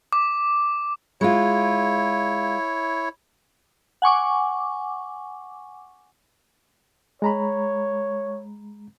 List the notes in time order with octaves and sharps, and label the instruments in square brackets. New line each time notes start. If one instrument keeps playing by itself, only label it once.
[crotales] D6
[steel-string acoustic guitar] G#3 F4 [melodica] E4 C#5
[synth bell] F#5 G#5 C#6 D6
[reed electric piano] G#3 A#5 B5 [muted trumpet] C#5